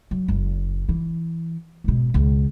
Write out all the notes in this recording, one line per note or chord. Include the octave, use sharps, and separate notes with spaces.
F#3
F#1
E3
G#2 B2
C#2